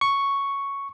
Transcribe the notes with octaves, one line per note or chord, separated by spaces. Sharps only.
C#6